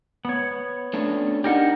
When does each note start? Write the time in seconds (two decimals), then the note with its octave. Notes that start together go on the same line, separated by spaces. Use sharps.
0.25 B3 C#5
0.93 A3 C#4 D4
1.44 D4 D#4 G4 A#4 F#5